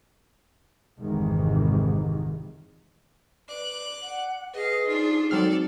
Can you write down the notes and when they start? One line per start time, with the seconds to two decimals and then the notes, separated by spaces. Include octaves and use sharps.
0.99 G#1 F2 G#2 C3 D#3 E3
3.49 B4 D5 D6 F#6
4.00 F#5
4.54 G#4 B4 D#5 F5
4.87 D4 D#4 F4 C5 D5
5.31 F#3 G#3 C4 D#4 F#4 A4 D5 F6